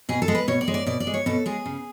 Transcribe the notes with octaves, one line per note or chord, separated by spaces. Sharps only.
B2 G#4
A4
G#3
B4
B2 C#5
D5
G#3
D5
B2 D5
D5
G#3
C#5
B2 A4
G#3 G#4
C#3